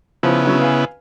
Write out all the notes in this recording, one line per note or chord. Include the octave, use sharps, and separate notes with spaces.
C#3 F3 B3 E4
D3 F#3 C#4
B4 F5 G#5